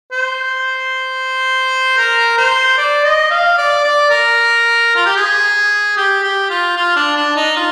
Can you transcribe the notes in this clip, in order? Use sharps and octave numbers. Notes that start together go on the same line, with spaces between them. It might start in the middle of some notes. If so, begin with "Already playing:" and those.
C5
A#4
C5
D5
D#5
F5
D5
D5
A#4
F4
G4
G#4
G4
G4
F4
F4
D4
D4
D#4
F4